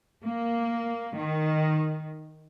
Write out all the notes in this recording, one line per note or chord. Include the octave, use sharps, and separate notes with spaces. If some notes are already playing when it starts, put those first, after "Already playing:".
A#3
D#3